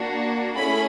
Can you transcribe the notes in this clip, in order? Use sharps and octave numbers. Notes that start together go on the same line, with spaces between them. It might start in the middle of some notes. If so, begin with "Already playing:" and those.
Already playing: A#3 D4 F#4
A3 C#4 E4 G#4 B5